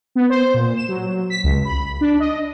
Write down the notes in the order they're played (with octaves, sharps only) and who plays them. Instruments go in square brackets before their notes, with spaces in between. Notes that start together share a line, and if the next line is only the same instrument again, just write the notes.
[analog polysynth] B3
C5
A#2
E7
F#3
B6
C#2
B5
D4
D#5